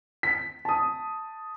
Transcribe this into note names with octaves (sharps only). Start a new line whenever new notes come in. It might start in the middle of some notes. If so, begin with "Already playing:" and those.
B6
A5 D#6